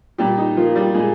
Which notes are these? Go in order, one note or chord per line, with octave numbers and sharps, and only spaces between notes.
A#2 G3 G4
D#4
F3 A#3 F4
G3 G4
A#2 G#3 G#4